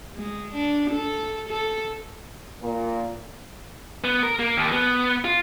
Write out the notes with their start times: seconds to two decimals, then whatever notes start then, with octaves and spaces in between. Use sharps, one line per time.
0.14 G#3
0.54 D4
0.90 A4
1.49 A4
2.62 A#2
4.04 B3
4.23 A#4
4.39 A#3
4.57 D#2
4.72 B3
5.24 F4